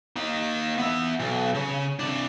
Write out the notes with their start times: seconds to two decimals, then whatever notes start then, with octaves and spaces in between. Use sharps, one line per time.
0.17 A#3 D#4
0.78 B3 E5
1.20 B1
1.55 C#3
2.00 C3 D4